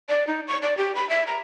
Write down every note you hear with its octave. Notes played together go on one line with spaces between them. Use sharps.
D5
D#4
C#6
D5
G4
B5
E5
A#5